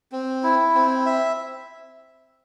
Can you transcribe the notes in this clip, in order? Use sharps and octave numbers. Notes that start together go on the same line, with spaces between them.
C4
E4
C4
E5